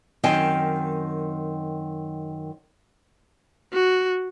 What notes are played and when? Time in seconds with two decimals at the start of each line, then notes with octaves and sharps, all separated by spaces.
0.23 F#2 D#3 C4 D#5 G5 G#5
3.73 F#4